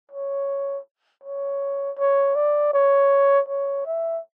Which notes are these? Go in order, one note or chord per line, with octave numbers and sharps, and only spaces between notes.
C#5
C#5
C#5
D5
C#5
C#5
E5